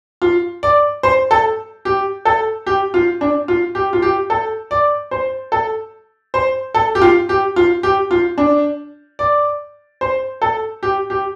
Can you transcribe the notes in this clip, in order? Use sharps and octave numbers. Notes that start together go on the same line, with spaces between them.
F4
D5
C5
A4
G4
A4
G4
F4
D4
F4
G4
F4
G4
A4
D5
C5
A4
C5
A4
G4
F4
G4
F4
G4
F4
D4
D5
C5
A4
G4
G4